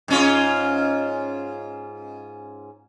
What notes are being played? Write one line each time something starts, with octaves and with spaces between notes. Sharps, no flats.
G#2 C#4 F4